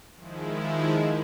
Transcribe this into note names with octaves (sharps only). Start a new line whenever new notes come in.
D#3 F3 G#3 E4